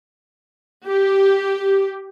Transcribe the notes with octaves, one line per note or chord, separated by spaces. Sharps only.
G4